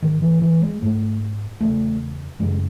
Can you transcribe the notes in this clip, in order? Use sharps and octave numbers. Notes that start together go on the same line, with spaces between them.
G#2 D#3
E3
E3
G#3
G#2 A3
E2 C#3 A3
F#2 C#3 G#3